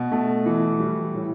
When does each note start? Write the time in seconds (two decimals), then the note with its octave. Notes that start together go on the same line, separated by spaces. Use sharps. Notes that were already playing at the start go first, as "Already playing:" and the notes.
Already playing: B2
0.12 A3
0.46 E3
0.80 G3
1.14 A2